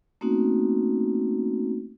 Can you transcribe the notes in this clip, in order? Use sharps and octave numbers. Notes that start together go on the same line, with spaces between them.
A3 A#3 C4 C#4 D#4 F#4